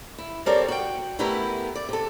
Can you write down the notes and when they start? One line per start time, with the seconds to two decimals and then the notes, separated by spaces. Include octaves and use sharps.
0.18 E4
0.46 G3 C4 A4 A#4 C#5 D5
0.68 F#4 G5
1.19 A3 B3 E4 G4 A#4 B4
1.75 D5
1.89 C3 A4